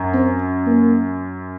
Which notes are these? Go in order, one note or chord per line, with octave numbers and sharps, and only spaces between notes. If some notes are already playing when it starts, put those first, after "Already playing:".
Already playing: F#2
C4
A#3